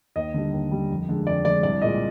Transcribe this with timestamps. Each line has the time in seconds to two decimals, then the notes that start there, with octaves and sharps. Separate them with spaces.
0.16 D#2 D#5
0.34 D3 G3
0.53 D#2
0.71 D3 G3
0.90 F2
1.09 D3 G#3
1.27 F2 D5
1.44 D3 G#3 D5
1.63 C2 D5
1.81 A#2 G#3 D#5